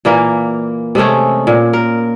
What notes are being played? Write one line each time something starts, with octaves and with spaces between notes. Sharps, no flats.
A#2 E3 A#3
C3 G#3 A3 C#4
A#2
A#4